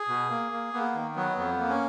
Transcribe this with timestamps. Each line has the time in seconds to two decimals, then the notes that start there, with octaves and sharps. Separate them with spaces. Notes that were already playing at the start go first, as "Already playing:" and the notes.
Already playing: G#4
0.08 B2
0.29 A#3
0.52 A#3
0.73 A#3 B3
0.94 D#3
1.16 F#3 B3
1.37 F2 B3
1.59 A#3
1.69 C#4